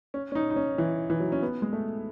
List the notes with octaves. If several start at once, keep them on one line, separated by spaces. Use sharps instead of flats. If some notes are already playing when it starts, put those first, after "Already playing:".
C#4
C#4
D#4
D#4
C#4
E3
E3
F#3
C#4
B3
G#3
A3